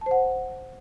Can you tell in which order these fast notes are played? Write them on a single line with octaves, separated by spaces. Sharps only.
A5 C5 F#5